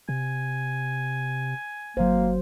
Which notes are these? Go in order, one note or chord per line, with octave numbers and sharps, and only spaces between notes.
C3 G#5
G1 F#3 A#3 C5